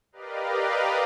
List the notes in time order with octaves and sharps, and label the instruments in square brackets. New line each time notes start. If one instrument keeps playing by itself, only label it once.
[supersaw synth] G4 A#4 B4 D5 D#5 F5